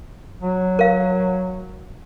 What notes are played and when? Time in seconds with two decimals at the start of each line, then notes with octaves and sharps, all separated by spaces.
0.42 F#3
0.79 A#4 F5